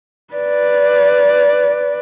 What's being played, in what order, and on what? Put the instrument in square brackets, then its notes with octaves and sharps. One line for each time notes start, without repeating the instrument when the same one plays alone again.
[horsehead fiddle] B4 D5